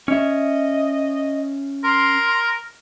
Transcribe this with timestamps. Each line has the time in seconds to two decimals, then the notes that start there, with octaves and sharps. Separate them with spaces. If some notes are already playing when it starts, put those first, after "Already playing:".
0.08 C#4 D#5 E5
1.84 A#4 C6